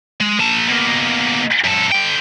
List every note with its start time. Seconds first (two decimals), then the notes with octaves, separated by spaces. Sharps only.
0.20 G#3
0.40 A#3 A5
0.68 B2 A#3
1.64 F#2 A4
1.92 D3 G5